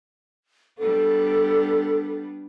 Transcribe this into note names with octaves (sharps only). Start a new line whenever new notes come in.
G3 B3 D4 A4